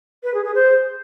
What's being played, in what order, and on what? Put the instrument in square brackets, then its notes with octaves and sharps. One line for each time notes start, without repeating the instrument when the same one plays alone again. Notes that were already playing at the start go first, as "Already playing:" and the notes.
[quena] B4
G#4
G#4
C5